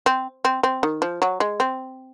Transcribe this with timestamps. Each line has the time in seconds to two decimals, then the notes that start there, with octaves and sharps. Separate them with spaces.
0.06 C4
0.45 C4
0.63 C4
0.83 D#3
1.02 F3
1.22 F#3
1.40 G#3
1.60 C4